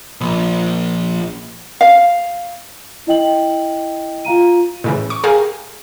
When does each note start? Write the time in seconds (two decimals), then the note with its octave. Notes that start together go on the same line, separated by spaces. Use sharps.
0.21 A#1
1.81 F5
3.07 E4 D#5 G5 F#7
4.25 F4 F5 A#5 D#7
4.84 A2 C#3 E3
5.10 C#6
5.24 G4 G#4 A#4 F5 G#5